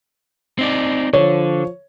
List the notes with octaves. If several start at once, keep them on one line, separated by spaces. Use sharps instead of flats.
C4 D#4 D5
D3 F3 C#5